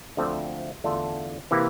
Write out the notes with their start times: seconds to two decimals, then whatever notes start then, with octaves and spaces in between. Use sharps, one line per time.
0.17 D2 D3 F3 A3 C4
0.84 E2 D3 A3 D4 F4
1.51 C3 E3 A#3 E4 G4